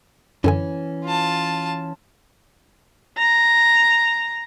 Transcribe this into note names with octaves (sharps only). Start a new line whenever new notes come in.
F#2 D3 E3 C#4 G#5
F4 A5
A#5